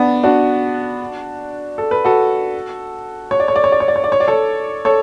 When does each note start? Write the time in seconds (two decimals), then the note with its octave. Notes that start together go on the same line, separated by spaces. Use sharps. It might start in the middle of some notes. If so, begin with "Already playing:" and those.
Already playing: B3 D4
0.23 D4 F#4
1.78 A4
1.91 B4
2.05 F#4 A4
3.31 C#5
3.40 D5
3.48 C#5
3.56 D5
3.64 C#5
3.72 D5
3.80 C#5
3.88 D5
3.96 C#5
4.04 D5
4.12 C#5
4.20 D5
4.28 A4 C#5
4.85 A4 C#5